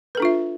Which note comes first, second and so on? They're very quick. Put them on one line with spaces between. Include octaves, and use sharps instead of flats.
B4 A4 D4 F4 E5